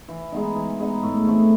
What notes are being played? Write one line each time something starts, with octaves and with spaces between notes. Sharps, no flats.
E3
G#3 B3 D#4
E3
G#3 B3 D#4
A2
E3 A3 C4